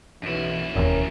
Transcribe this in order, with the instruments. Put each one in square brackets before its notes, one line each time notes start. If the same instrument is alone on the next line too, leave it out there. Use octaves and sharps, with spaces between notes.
[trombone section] B1 E3 [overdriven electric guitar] F#2 E4
[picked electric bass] E1 D#2 [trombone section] C#4 A#4